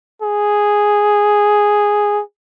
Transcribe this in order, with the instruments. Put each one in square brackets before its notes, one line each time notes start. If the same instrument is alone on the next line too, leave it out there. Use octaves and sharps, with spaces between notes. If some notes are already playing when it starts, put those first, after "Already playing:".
[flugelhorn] G#4